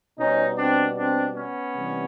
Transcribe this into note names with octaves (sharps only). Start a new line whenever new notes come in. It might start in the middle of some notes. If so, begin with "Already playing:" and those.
B2 G3 C#4 D#4
C4 D4
C4 D4
B3 C#4
C3 E3 G3